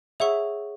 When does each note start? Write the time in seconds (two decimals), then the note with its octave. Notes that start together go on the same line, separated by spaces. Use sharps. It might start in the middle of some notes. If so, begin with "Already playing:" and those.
0.20 G#4 C#5 E5 F#5 C#6